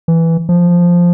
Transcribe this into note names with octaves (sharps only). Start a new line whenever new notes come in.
E3
F3